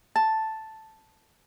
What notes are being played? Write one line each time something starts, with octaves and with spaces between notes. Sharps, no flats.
A5